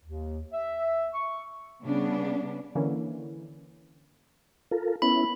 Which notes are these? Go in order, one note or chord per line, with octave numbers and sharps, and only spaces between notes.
D#2
E5
C#6
C#3 G3 B3 D4
D3 E3 A#3 C#4
F4 A4 A#4
B3 C#4 E4 B5